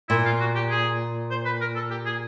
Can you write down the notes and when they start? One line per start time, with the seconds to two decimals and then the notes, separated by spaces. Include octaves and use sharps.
0.09 A#2 E4
0.25 F4
0.40 F#4
0.55 G4
0.70 G#4
1.31 C5
1.45 B4
1.61 A#4
1.75 A4
1.91 G4
2.05 G#4